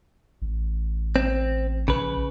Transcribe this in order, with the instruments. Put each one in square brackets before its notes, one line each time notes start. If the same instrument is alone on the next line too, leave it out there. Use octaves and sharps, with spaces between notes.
[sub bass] A1
[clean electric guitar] C4
[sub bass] A#1 [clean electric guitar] C#3 B4